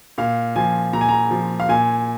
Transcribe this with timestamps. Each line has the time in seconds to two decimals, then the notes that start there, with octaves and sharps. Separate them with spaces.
0.18 A#2 F5
0.56 F3 G#5
0.93 A#2 A#5
1.01 G#5
1.09 A#5
1.31 F3
1.60 F5
1.69 A#2 G#5